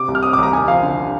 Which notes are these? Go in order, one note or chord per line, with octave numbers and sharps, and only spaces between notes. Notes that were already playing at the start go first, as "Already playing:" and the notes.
Already playing: C3 D6
C2
F6
C3 D#6
D6
C2 A#5
D#2 G#5
F3 F5
D3